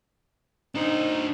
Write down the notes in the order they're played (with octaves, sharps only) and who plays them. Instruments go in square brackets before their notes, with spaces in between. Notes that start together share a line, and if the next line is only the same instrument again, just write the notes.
[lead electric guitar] D4 C5 [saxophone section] D#4